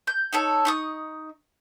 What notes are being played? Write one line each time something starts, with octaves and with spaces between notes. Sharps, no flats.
G6
D#4 A4 C#5
D#4 C#6 D#6